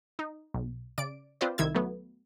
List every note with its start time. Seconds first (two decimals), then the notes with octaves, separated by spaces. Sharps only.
0.19 D#4
0.54 B1
0.98 C#3 D5 D7
1.41 C4 F4 B4 C5 D5
1.58 C2 D#3 E4 E6 G#6
1.75 F#3 A3 B3